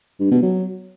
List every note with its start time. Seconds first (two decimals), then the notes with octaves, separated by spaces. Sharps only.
0.20 G2
0.31 B2
0.42 F#3